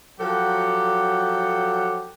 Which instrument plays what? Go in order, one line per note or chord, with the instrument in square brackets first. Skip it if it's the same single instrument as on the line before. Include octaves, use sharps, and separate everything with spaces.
[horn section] F3 F#3 G4 A4 F#5